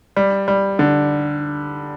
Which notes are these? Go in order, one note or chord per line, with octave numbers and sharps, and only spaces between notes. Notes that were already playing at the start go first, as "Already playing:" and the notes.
G3
G3
D3